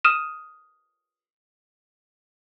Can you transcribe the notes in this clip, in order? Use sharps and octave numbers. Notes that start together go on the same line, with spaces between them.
D#6 F6 D#7 E7